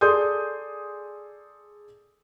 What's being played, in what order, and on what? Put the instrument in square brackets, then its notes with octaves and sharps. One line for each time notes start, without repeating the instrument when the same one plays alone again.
[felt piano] G#4 A4 D5 C6 D#6 G6